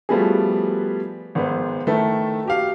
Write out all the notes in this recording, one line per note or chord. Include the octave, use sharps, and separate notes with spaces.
F3 G3 A3 B3 F#4 G#4
G#1 G#2 B3 C5
D#3 A3 E4 A4 B4
F#4 G4 F5